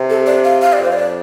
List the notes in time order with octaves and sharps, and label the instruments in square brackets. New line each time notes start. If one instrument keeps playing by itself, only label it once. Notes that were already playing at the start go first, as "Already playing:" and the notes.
Already playing: [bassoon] C3
[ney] A4
D5
F5
F5
D5
[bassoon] F2 [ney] C5
[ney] D5